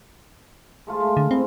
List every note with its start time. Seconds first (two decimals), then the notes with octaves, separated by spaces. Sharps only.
0.87 G#3 A3 F4
1.00 A3
1.17 D3
1.31 G#2 G#3 C4 E4